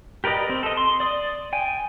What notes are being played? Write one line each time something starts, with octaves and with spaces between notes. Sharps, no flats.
G4 A#4 B4 D5 D#5
C4
A4 D#5
C6
D5 D#6
G5 G#5